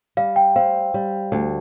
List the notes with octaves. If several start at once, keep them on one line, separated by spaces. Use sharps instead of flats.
G3 F5
G5
C4 F5
G3
D2